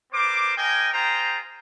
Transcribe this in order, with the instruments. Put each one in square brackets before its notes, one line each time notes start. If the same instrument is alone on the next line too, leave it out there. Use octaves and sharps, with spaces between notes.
[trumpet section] B3 A#4 C5 D6
A#4 D#5 G5 G#5
F4 G#4 C5 G5 A#5